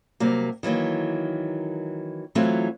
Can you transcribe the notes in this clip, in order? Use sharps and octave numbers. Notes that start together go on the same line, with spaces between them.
C3 F#3 G3 A#3
D#3 E3 F#3 A#3
E3 F#3 A3 C4 F4